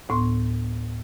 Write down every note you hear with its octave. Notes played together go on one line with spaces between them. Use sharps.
D2 A2 B3 C6